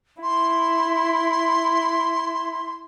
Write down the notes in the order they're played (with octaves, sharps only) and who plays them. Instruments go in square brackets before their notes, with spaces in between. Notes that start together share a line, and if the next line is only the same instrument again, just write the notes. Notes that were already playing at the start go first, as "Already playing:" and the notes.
[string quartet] E4 [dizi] C6